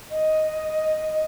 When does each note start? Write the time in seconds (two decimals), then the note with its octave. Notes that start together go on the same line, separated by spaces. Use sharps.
0.11 D#5